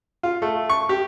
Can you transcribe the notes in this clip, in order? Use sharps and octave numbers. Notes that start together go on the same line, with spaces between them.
F4
A3
C#6
G4